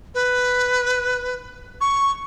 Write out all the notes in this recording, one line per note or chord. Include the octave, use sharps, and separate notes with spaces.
B4
C#6